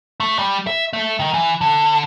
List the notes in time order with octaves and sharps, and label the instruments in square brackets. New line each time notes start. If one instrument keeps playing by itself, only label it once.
[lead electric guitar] A3
G3
E5
A3
D#3
E3
D3